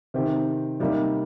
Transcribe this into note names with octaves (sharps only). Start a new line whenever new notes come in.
C3 D#3 C4 G4
C3 G3 A#3 D#4 G4